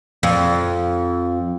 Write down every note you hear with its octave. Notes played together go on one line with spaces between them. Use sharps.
F2